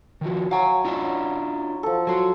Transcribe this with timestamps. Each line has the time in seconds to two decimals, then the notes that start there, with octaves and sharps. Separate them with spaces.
0.21 D#3 F3 F#4
0.51 F#3 C#5 F5 G#5
0.85 D4 E4 F4
1.83 F3 A4
2.07 F#3 F#4 A4 C6